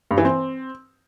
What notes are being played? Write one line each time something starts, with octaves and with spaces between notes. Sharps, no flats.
G2
E3
C4